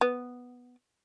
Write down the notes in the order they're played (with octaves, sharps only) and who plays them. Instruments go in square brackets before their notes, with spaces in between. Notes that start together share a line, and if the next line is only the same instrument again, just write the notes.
[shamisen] B3